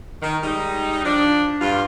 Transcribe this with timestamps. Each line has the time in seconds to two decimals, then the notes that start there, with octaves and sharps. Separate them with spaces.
0.22 D#3
0.43 G3 G#3 D#4
1.05 F3 D4
1.61 G2 F4